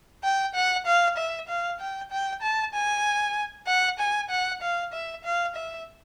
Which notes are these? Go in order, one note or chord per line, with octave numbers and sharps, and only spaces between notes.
G5
F#5
F5
E5
F5
G5
G5
A5
G#5
F#5
G#5
F#5
F5
E5
F5
E5